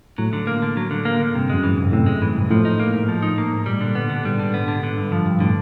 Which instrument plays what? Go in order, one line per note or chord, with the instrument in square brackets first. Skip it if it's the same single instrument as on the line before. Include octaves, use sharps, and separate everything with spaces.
[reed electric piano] A2 [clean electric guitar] F#3
[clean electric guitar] D3
A#3
D3
F#3
D3
A#3
D3
[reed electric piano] G2 [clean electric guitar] C3
[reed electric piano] F#2 [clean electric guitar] G#3
[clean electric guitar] E3
[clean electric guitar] C2 [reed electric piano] G#2
[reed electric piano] A2 [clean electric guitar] C3
[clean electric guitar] G#3
E3
C2
[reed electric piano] A2 [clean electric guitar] F3
[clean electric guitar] D#4
A#3
G#2
F3
D#4
A#3
G#2
[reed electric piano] A#2 [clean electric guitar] G3
[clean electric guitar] D3
B3
D3
[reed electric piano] G#2 [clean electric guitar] G3
[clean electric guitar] D3
B3
D3
D3
G2
F3
G2
[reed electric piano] A2 [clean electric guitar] D3